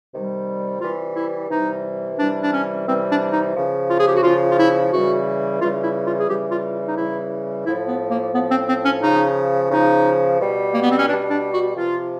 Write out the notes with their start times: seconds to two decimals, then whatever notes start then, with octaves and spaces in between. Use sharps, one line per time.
0.13 C3 D#3 G3
0.81 C3 E3 G3 F4
1.15 E4
1.50 C3 E3 G3 D#4
2.18 C3 E3 G3 D4
2.42 D4
2.52 C#4
2.86 C3 E3 G3 C4
3.10 D4
3.32 D#4
3.55 C#3 F3
3.89 F4
4.00 G#4
4.07 G4
4.16 F#4
4.23 C#3 F3 F4
4.49 F4
4.58 E4
4.92 C#3 E3 G3 F#4
5.60 C#3 E3 G3 F4
5.83 E4
6.05 F4
6.19 G#4
6.28 C#3 E3 G3 G4
6.51 F4
6.87 D#4
6.97 C#3 E3 G3 E4
7.65 A2 F3 E4
7.88 B3
8.10 A#3
8.33 A2 F3 B3
8.51 C4
8.68 C4
8.85 C#4
9.02 C#3 F3 D#4
9.70 C#3 F3 D#4
10.39 B2 G3
10.73 A#3
10.82 B3
10.90 C4
10.99 C#4
11.07 B2 G3 D4
11.30 D4
11.53 F#4
11.75 C3 F3 F4